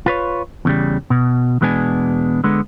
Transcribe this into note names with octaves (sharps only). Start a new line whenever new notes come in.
F4 B4 C#5
E2 C#3 G3
B2
E2 B2 G#3 B3 D4 G#5
D3 G#3 B3